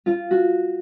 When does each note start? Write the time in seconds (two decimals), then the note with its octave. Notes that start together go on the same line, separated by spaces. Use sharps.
0.06 F4
0.31 F#4